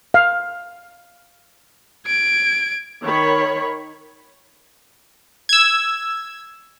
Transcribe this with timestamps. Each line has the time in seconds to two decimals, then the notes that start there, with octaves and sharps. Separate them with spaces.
0.14 F5
2.07 G#6 D7
3.03 D#3 C#5 B5
5.49 E6 G#6